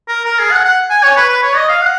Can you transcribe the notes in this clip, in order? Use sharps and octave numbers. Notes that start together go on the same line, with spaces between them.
A#4
A#4
G#4
F#5
F#5
G#5
C#5
B4
B4
C#5
D#5
F5
F#5